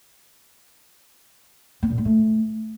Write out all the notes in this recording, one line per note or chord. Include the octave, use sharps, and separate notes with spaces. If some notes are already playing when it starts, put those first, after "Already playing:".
B3
A#2
G#3
A3